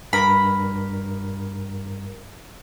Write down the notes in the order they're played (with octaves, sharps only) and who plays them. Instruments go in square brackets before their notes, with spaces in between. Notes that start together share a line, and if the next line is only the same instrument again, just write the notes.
[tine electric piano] G2 A#4 A#6 [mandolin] B5